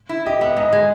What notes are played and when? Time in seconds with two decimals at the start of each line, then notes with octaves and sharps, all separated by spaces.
0.09 E4
0.26 G4 D#5
0.41 B3 E5
0.57 G#2 D#5
0.73 G#3